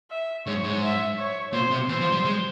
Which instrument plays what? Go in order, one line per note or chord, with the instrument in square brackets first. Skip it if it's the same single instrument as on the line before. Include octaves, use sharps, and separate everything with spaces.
[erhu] E5
[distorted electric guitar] G#2 [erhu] C#5
[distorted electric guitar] G#2
[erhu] E5
C#5
[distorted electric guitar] A#2 [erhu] C5
[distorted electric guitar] C3
[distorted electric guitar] E3 [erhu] C5
[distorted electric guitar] F3
G3
G#3